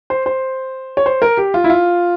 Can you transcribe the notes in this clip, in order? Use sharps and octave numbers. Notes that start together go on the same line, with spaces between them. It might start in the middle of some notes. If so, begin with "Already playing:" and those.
C5
C5
C#5
C5
A#4
G4
F4
E4
F4